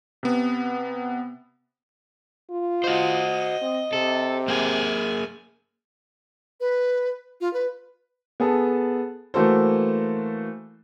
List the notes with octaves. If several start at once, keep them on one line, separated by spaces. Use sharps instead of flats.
C3 B3
F4
F#4 C5 D#5
C4
C3 A4
A#3 G#4 G#5
B4
F4
B4
B3 G#4 A4 A5
E3 A3 A#3 F#4 A4 C5